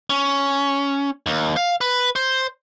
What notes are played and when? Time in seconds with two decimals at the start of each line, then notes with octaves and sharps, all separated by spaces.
0.10 C#4
1.26 D#2
1.57 F5
1.81 B4
2.16 C5